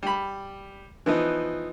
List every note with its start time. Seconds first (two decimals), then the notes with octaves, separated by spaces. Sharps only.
0.03 G3 B5
1.06 E3 F3 B3 D#4